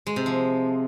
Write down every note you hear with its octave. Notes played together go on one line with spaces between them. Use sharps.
G#3
C3
F3